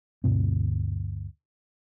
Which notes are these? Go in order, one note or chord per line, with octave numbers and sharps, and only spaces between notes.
D2 G2 B2 C4